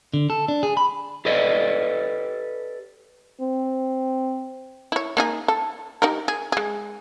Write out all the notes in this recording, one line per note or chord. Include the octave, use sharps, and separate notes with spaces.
D3
A4
D4
G#4
B5
G4 A4 B4 D5 D#5
C4
E4 C#5
A#3 D#4 G#4
A4
D#4 G4 A#4
G#4
G#3 G#4